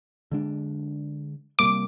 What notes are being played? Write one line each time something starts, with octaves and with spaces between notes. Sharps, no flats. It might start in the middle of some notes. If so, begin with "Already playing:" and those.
D3 G#3 D4
C3 G3 A#3 D6